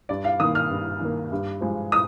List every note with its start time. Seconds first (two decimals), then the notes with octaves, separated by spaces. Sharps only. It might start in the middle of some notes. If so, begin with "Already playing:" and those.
0.09 G2 D5
0.24 F5
0.40 D#3 A#3 D#6
0.55 F6
0.70 G2
1.01 D#3 A#3
1.32 G2
1.61 F3 G#3
1.92 D#6